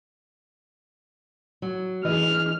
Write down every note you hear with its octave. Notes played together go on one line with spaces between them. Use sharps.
F#3
E3 G#4 D#5 F6